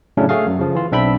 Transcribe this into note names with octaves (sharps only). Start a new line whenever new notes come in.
A2 C#3 F#3 A3 C#4 D4
A3 F#4 G#4 F5
F#2
C#3 F3
E3 F4
B1 C4 D4 E5 G5 B5